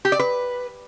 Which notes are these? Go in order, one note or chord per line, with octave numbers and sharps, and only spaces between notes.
G4
D5
B4